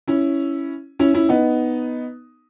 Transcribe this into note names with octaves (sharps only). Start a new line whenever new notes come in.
C#4 E4
C#4 E4
C#4 E4
B3 D#4